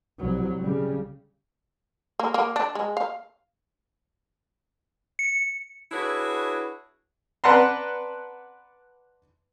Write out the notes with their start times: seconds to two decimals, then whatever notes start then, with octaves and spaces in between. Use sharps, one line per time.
0.19 C2 F#3
0.59 C#3 G3
2.19 A#3
2.34 A#3
2.56 D4
2.75 G#3
2.97 F5
5.19 C#7
5.92 D4 E4 F#4 G#4 B4 C#5
7.44 B4 D5 F#5 A5 A#5 C6